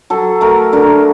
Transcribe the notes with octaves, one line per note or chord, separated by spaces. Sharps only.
F#3 A4
A3 A#4
D3 A#4